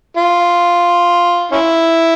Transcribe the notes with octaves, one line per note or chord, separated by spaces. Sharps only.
F4
C#4 E4